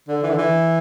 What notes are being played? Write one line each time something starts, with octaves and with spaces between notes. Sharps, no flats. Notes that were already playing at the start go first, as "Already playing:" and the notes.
D3
E3
D3
E3